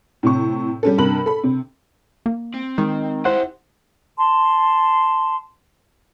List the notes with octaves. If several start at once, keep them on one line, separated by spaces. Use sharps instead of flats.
A2 C3 C#6
G3 C#4 A4
G2 C3 A#4 B5 F#7
A4 B5
C3
A#3
C4
D#3 G#3
E4 G4 C5 F#5
A5 C6